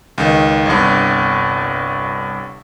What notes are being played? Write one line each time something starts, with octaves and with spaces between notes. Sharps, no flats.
C#2 D#3
G1 C2 G2